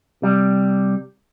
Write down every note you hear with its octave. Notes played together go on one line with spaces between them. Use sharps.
C3 G3